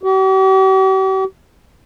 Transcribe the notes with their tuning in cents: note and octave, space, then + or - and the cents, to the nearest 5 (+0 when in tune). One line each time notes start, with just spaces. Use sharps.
G4 -45